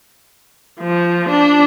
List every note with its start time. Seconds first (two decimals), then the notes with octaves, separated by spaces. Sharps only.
0.80 F3
1.29 D4